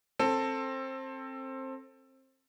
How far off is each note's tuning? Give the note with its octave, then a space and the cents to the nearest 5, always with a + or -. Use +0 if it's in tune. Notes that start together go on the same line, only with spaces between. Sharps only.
C4 +20 A4 +15